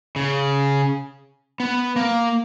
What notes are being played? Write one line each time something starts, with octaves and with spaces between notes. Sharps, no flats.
C#3
B3
A#3